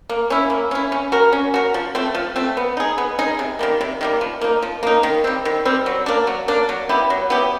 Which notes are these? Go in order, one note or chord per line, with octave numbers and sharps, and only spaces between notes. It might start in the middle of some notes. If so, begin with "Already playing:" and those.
A#3
C#4 E4
A#3
C#4 E4
C#4
F#4 A#4
C#4
F#4 A#4
F3
A3 C4
F3
A3 C4
B3
D#4 G#4
B3
D#4 G#4
C3
D#3 G3 A#3
C3
D#3 G3 A#3
F3
A#3 D#4
F3
A#3 D#4
D#3
G3 C4
D#3
G3 C4
F#3
A#3 D4
F#3
A#3 D4
F#3
B3 E4 G4
F#3
B3 E4 G4